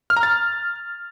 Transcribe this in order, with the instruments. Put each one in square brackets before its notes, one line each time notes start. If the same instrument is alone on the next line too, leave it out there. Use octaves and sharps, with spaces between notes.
[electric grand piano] F6
A#5
A6